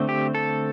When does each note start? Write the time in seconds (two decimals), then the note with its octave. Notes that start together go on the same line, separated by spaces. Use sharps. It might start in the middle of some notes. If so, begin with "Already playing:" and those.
Already playing: D3 A3 C4
0.09 G4
0.35 A4